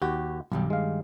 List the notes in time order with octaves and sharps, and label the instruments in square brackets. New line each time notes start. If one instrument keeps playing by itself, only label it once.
[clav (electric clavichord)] D#2 F#4 [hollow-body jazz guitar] G4
[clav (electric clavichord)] B1 [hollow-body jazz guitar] G2 D#3 G3
[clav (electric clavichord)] G#3 F5